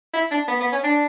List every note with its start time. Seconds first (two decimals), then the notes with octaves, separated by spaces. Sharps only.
0.14 E4
0.31 D4
0.48 B3
0.60 B3
0.72 C#4
0.84 D4